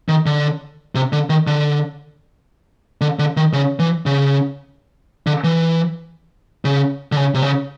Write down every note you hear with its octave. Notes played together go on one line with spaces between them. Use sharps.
D#3
D3
C3
D3
D#3
D3
D3
D3
D#3
C#3
E3
C#3
D3
E3
C#3
D3
C#3
C3
C#3